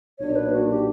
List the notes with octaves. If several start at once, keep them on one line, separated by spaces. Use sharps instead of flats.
B1 A#2 A#3 D4 C#5
B4
F#4
G4